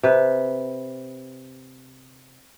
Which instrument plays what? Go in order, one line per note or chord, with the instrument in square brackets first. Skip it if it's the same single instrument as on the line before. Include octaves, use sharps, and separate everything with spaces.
[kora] C3 B4